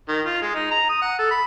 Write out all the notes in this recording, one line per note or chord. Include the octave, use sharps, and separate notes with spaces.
D#3
F4
G#3
D#4
A#5
D#6
F#5
A4
B5